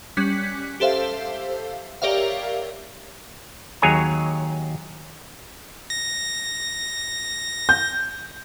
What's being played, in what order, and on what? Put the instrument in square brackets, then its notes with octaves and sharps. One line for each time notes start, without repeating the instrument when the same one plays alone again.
[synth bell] G3 C#4 F#6 B6
G4 A4 C5 E5 F5
G4 A#4 C#5 D5 E5 F5
[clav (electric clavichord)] D#2 F#3 G#4 C#5 G#5 A#5
[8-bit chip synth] A#6
[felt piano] G6